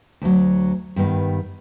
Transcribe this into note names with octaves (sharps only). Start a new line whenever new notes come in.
D2 F#3
G2 D#3 B3